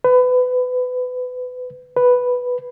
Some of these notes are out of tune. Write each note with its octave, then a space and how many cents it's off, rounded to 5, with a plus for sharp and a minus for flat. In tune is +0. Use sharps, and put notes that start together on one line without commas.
B4 +25
B4 +0